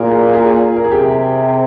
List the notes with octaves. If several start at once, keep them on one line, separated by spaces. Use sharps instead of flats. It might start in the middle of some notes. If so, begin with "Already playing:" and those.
Already playing: A#2 G#4 A#4
G#4
A#4
G#4
C3 G4